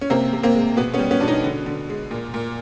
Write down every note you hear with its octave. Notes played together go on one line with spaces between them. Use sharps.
C#4
C3 A#3 C4
C3
A#3 C4
G#3
B2 B3
B3 C#4
G3
B3 C#4
B2 D4
C#4 D#4
D3
D3
G#3
A#2
A#2